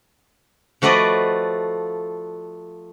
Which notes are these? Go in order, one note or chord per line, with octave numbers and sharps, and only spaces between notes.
F3 A3 F#4 B4 D5 D#5